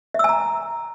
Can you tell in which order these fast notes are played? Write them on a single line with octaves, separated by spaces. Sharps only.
E5 E6 G#5 A#5